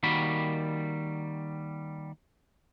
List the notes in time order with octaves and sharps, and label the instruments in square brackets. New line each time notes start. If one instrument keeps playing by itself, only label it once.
[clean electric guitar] D#3 G3 A#3 F#4 B5